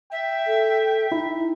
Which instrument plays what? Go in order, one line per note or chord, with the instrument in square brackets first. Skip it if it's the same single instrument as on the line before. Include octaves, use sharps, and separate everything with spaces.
[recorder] E5 [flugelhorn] G5
[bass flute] A4
[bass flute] D#4 [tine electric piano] E4